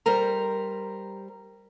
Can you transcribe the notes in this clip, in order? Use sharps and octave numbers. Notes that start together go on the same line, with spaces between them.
G3 A#4 C5 A#5